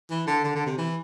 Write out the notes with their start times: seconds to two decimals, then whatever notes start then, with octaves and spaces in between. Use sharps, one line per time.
0.10 E3
0.27 D3
0.44 D3
0.55 D3
0.66 C3
0.78 E3